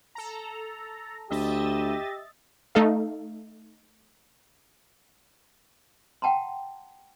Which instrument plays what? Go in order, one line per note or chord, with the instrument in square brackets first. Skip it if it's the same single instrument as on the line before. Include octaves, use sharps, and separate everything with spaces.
[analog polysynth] A4 A#5
[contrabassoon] D2 [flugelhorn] G4 [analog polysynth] D#5 E5 A6
[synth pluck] A3 D#4 A4 F5
[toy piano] F#5 G5 A5 A#5 C6